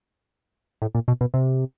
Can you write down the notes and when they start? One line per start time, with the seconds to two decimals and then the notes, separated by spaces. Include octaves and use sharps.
0.82 A2
0.95 A#2
1.08 B2
1.21 B2
1.34 C3